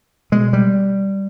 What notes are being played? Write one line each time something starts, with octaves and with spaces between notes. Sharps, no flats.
B2 G#3
G3